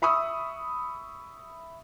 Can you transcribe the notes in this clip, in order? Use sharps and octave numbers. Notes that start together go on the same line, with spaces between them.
E5 B5 C#6 D#6 E6